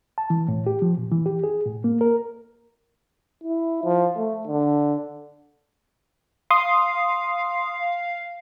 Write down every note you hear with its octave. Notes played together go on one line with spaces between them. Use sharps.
A5
E3
A2
G4
F3
A#2
E3
G4
G#4
A2
A#3
A#4
E4
F3
A3
D3
F5 C6 D#6